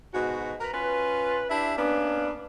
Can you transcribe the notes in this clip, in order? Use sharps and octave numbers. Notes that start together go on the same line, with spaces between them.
G#2 B2 F#4
A#4 B4
C#4 F4 B4
D4 E4 G4 E5
A#3 B3 C#4 D4